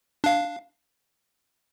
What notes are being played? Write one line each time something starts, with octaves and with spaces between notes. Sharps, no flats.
D4 F5